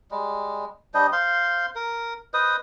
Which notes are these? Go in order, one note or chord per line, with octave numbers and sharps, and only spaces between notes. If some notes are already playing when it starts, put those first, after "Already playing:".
G3 G#3
G3 D4 C5 D#5
C5 F5 C6
A#4
B4 C5 D#5 D#6